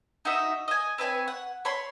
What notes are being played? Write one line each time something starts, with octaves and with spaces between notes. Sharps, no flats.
D#4 F#4 D#5 E5
D#5 G#5
C4 B4 C#5 G#5
F#5
C#5 B5 C6